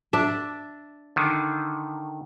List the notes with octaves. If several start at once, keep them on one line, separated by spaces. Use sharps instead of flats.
D4 E5
D3 D#3